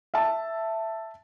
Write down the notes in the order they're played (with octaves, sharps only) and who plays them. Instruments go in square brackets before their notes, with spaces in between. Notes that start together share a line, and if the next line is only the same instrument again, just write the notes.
[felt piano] E5 A5